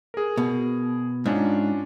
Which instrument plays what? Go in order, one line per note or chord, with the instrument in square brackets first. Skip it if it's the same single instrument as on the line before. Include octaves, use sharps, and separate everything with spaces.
[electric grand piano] G#4 A#4
[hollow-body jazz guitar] B2
[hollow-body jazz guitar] G#2 [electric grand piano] C#4 D4 F4